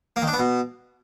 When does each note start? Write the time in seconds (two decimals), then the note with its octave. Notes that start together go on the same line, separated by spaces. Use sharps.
0.16 A#3
0.22 D#3
0.28 D4
0.33 B3
0.39 B2